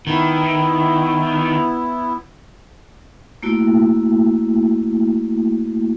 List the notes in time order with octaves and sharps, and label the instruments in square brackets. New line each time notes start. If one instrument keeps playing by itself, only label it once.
[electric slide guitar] D#3 [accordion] B3 E4
[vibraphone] A3 A#3 E4 F#4